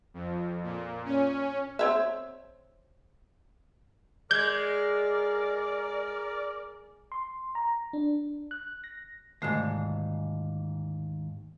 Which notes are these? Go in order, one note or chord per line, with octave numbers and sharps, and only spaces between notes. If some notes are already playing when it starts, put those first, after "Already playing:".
F2
A#2
C#4
C4 C#5 E5
G#3 A#4 D5 G6 G#6
C6
A#5
D4
F#6
A#6
D#2 G#2 D3 A3